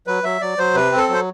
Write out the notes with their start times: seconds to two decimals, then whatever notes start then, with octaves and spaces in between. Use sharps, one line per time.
0.07 F#3 B4
0.23 F#3 E5
0.41 F#3 D5
0.58 F#3 C5
0.74 C3 B4
0.92 C4
0.97 A4
1.09 F#3 C5